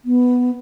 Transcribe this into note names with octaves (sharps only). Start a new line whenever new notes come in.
B3